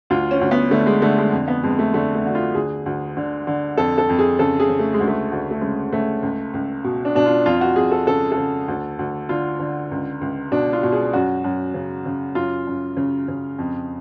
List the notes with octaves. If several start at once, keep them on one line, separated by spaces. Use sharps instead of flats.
D2 F4
C#4
D2
B3
D3 A3
G#3
D3 A3
G#3
F2
B3
F2 G#3
A3
D3 A3
A3
D3 F#4
F4
D2 G#4
D2
D3
D3
F2 A4
A4
F2
G#4
C#3 A4
G#4
C#3
A3
G#3
D2
A3
D2
A3
C#3 G#3
C#3 A3
C#2
C#2
B2
D4
B2 D4
F4
F2 F4
F#4
F2 G#4
A4
C#3 A4
A4
C#3
D2
D2
D3 F4
D3
C#2
C#2
B2 D4
F4
B2
G#4
F#2 F#4
F#2
C#3
C#3
F#2 F4
F#2
C#3
C#3
F2